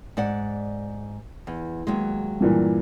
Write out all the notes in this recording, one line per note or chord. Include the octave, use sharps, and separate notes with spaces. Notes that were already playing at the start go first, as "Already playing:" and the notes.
G#2 D5 F#5
E2
D#2 F#3 G#3
G2 A#2 E3